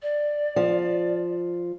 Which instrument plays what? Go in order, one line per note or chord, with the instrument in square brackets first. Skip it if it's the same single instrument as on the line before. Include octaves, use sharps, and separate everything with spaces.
[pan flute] D5
[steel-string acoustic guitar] F3